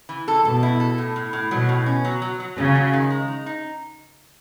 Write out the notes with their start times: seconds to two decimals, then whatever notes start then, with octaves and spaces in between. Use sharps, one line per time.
0.09 E3
0.28 A4
0.44 B2 A4
0.63 E4
0.80 A4
0.98 A2
1.16 A2
1.33 A2
1.51 B2 F#3
1.69 A2
1.86 C#4
2.05 F#3
2.22 F#3
2.40 F#3
2.57 C#3 F#3
2.75 F#3
2.93 D#3
3.10 G#3
3.28 D#4
3.46 D#4